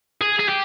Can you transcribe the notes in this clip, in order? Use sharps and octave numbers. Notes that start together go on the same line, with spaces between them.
G#4
G#4
G4